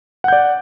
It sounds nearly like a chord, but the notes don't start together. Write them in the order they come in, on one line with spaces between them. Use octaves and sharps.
F#5 G6 D5